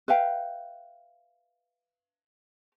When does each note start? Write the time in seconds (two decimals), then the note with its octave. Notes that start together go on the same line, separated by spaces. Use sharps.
0.08 B4 E5 F5 G5